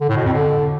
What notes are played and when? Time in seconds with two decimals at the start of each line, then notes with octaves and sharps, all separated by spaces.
0.01 D3
0.09 A2
0.17 B2
0.25 F2
0.33 D3